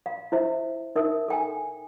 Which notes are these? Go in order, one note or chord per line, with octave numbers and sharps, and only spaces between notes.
F5
E4 C5 E5
D#4 A#4 E5 D#6
A4 G5 G#5